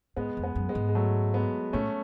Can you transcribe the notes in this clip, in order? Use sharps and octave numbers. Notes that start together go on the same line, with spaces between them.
G#2 G#3 B3
F2
G#3 B3
F#2
G#3 B3
G#2
G#3
F#3 A3
G#3 B3
A2 A3 C#4